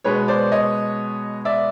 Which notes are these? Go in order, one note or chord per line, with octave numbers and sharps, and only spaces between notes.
B2 G#3 B3 B4 C#5
C5 D5
C#5 D#5
D5 E5